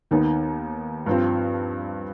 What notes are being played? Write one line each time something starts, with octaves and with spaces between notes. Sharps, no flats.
D#2 D#3 B3 D#4
G2 F3 C4